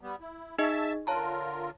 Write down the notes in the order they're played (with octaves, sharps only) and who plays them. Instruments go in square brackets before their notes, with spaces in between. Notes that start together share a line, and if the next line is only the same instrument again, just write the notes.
[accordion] G3 B3
E4
[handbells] D#4 G#4 D#5 [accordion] E5 A5
[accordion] D3 F4 A#4 [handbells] C#5 A5 A#5